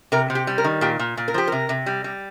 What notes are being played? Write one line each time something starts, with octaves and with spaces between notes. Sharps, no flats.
C3 A#4
C3
G4
G3
A#4
D#3
A#2 G4
A#2
A#2
A#4
F3 G4
C3 A#4
C3
G3
G3